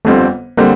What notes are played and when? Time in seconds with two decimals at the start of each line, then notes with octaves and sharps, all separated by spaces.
0.05 G1 F2 D3 G3 A3 C4
0.57 D3 G3 A#3 C4